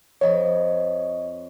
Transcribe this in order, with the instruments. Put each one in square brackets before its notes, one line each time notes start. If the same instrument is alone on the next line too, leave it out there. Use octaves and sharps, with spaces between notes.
[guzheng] F2 F3 B5 [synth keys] C#5 D#5